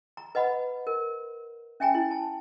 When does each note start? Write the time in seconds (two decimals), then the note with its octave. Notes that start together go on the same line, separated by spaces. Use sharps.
0.17 A#5
0.35 B4 D#5 F#5 B5
0.87 A#4
1.80 C#4 E5 G5 G#5 A#5
1.95 E4
2.11 A5